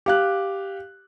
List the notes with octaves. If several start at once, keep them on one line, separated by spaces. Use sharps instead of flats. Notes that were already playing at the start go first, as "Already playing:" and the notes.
G4 F5 F#6